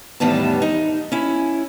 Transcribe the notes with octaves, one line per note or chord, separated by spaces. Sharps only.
E2 A2 D#3 G3 B3 A5
D#4
C#4 E4